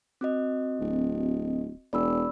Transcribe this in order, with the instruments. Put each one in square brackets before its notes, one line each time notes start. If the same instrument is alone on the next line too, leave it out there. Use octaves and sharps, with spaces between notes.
[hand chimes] C4 F#4 D#5
[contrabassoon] D1
[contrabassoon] E1 [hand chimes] D5 B5 E6